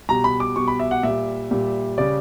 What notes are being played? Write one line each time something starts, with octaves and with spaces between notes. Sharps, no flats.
B2 G3 A#5
B5
D6
B2 G3 C#6
B5
E5
F#5
A#2 G3 E5
A#2 G3
C#3 G3 D5